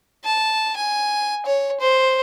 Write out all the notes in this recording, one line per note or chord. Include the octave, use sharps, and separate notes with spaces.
A5
G#5
C#5
C5